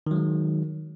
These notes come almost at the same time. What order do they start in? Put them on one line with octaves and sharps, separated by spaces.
D#3 F#3 G#3